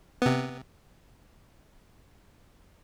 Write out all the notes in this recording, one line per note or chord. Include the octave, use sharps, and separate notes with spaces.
C3 B3